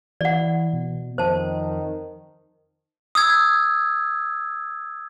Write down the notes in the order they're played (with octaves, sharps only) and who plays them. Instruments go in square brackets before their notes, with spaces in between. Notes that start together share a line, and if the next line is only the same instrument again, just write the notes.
[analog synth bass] E3 [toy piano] D5 F#5
[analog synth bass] B2
[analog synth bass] F2 [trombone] D#3 [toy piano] C5 A5
[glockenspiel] D#6 E6 G#6